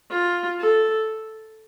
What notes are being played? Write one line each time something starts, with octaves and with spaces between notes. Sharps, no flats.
F4
A4